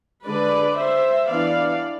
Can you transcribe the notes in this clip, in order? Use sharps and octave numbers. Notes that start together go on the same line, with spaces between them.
D3 G#3 D4 B4 D5
C5 E5
E3 B3 D4 D5 F5